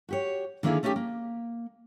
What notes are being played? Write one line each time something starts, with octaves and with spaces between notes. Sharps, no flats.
F#4 G4 C#5
D3 D#3 A#3 E4 G#4 F5
A3 C#4 D#4 F4 G4
A#3